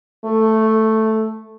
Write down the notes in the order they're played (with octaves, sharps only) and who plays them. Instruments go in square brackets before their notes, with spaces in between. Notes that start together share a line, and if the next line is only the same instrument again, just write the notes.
[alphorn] A3